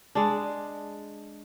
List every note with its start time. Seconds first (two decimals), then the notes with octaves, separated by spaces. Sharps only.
0.15 G#3 D4